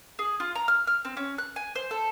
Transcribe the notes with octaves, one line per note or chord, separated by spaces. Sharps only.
G#4
F4
A#5
F6
F6
C4
C#4
F#6
G#5
C5
A4